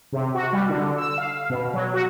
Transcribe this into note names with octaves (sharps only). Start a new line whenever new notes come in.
C3
F#4
G3
D3
E6
F5
B2
F#3
F#4